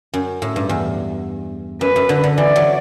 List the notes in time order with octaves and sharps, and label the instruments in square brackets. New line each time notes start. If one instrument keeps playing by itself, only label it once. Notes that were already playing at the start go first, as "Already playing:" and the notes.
[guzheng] F#2
A2
G2
E2
[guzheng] F#2 [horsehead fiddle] B4
[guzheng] F#2
D3
D3
[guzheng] E3 [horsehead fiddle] D5
[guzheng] F#3